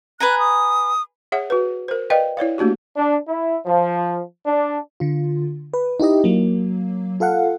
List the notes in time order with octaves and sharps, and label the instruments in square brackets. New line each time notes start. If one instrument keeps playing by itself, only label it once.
[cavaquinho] B4 G#5 A#5 [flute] F#6
[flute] D#6
[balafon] G#4 C#5 E5 F#5
F#4 B4
A#4 C5
B4 D5 D#5 F5 G5
E4 C#5 D5 F5
A3 A#3 D4 F#4 G4
[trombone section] D4
E4
F3
D4
[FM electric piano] D3 F4
B4
D#4 E4 G4 D#5
F#3 A#3
F4 A4 F5 F#5